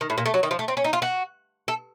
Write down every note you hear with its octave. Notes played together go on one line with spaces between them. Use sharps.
D#3
A2
A#2
A3
F#3
D#3
F3
A3
C4
C#4
D#4
F4
F#4
A4